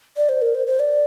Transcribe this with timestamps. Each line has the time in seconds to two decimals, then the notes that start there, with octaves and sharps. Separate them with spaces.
0.17 D5
0.29 C5
0.42 A#4
0.55 C5
0.67 C5
0.80 D5